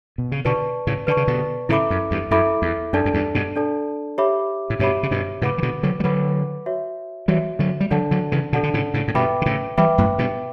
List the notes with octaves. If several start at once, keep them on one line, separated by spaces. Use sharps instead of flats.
B2
C#3
B2 D3 B4 D5 A5 C#6
A2 C#3
D3 B4 D5 A5 C#6
C#3
B2 D3
A2 C#3 E4 A4 E5 B5 D6
F#2
E2 G2
F#2 E4 A4 E5 B5 D6
E2
F#2 D4 A4 D5 A5
F#2
E2 G2
G2 B2
D4 A4 D5 A5
G4 C#5 E5 B5 D6
A2
G2 B2 G4 C#5 E5 B5 D6
C#3
G2 B2
A2 C#3 B4 F#5 B5 D6
E3
B2 D3
D3 F#3
G3
D3 F#3 B4 F#5 B5 D6
F#4 C#5 E5
E3 G3 F#4 C#5 E5
D3 F#3
G3
D3 F#3 D4 A4 D5 F#5 A5
D3 F#3
C#3 E3
B2 D3 D4 A4 D5 F#5 A5
D3
A2 C#3
A2 C#3
A2
G2 B2 B4 E5 G5 B5 D6
D3
A2 C#3
E3 G3 B4 E5 G5 B5 D6
F#2 A2
G2 B2